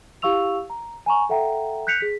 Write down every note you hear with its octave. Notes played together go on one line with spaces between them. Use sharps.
E4 G4 F5 C#6 E6 F7
A#5
G#5 A#5 C#6
A4 E5 F#5 G5 A#5
F#6 G6 B6 C#7 F7
G#4 B6